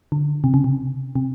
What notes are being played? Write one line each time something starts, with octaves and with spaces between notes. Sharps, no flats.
D3
C3
C#3
C3
C3